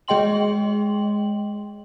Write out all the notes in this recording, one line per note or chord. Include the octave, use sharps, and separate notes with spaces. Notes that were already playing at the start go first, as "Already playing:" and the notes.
G#3 G#4 D#5 G5 C6 F#7